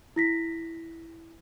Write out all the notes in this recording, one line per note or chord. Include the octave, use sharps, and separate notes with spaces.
E4 A#6 B6